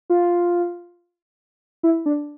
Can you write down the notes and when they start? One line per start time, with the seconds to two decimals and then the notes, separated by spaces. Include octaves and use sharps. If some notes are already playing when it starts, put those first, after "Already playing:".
0.10 F4
1.83 E4
2.06 D4